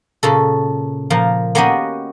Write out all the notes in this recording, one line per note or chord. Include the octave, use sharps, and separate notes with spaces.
A#2 C#3 A4
A#2 F3 A#3
A#3 B3 C#4 F#4 G4 D#5